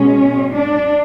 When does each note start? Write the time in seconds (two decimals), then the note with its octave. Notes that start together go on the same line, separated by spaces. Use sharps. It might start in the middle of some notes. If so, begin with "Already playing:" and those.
Already playing: B2 G#3 C#4
0.54 D4